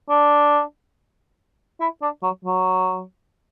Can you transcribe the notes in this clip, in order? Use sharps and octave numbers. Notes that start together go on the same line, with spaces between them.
D4
E4
D4
F#3
F#3